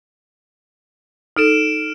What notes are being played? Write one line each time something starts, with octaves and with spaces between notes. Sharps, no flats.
D#4 A4 F6 D7 E7